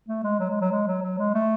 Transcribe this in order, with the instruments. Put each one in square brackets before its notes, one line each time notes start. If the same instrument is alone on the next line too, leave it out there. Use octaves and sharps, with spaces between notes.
[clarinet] A3
G#3
F#3
G#3
F#3
G#3
F#3
F#3
G#3
A3